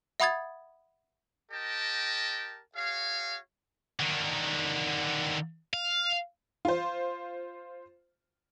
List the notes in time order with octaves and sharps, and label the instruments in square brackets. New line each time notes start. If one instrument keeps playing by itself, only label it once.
[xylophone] E5 F#5 B5 D#6 G#6 A6
[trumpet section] G4 A#4 D#5 G5 A5
F#4 G#4 C#5 F5
[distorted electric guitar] D3 D#3
F5
[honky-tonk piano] F4 C5